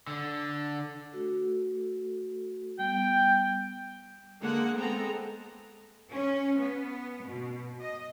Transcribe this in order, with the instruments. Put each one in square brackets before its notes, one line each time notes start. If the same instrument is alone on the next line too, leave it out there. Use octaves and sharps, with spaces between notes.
[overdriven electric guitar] D3
[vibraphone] A3 F#4 A4
[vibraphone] G3 B3 [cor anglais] G5
[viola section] D3 G#3 A#3 F#5
G#3 B3 C4 A4 A#5
[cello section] C#4
B3
B2
D#5